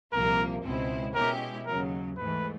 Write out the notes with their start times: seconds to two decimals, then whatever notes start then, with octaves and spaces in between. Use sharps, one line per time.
0.12 C2 A#2 F3 A#3 A#4
0.64 C#2 B2 G#3 C4 E4
1.15 B2 G#3 C#4 E4 G4 A#4
1.66 D#2 C#3 F#3 A#4
2.17 G#2 E3 A3 B4